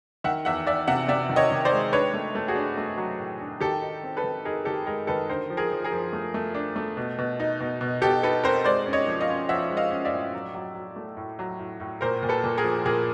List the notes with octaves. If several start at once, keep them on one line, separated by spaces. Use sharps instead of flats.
D#3 E5 F#5
E2 E5 F#5
E2 D5 E5
C3 E5 F#5
C3 D5 E5
D#3
C#5 D#5
D#3
C5 D5
G#3
D4 B4 C#5
A3
A3
F#4 G#4
D4
A3
F#3
A2
D4
D#3 G4 A4
D#4
C4
A4 B4
D#3
D#4 G#4 A#4
D#3 G4 A4
G#3 G#4 A#4
D#3 A4 B4
D3 A#4 C5
F3
G#4 A#4
F3
G#4 A#4
F3
A3
A3
D4
A3
B2
B2
D#4
B2
B2
B2 G4 A4
D#4 A4 B4
C4 A#4 C5
G#3 C5 D5
C#4
C#5 D#5
F3
D#5 F5
C#4
F3 E5 F#5
G#3
D#5 F5
C#4
D5 E5
A2
F#3
F#3
F#3
A3
A2
F#3
A2
A2
A#2 A#4 C5
A#2
A4 B4
A#2
G#4 A#4
F3
A#2 G#4 A#4